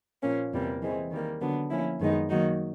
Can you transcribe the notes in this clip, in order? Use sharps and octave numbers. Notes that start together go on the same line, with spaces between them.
A#2 F3 A#3 C#4
E2 C3 E3 G3 A#3
E3 G#3 C4
D#3 G3 A#3
D3 F#3 B3 D4
F3 A#3 C#4 E4
F#2 D#3 G#3 B3 D#4
D#3 F#3 A#3 D#4 F#4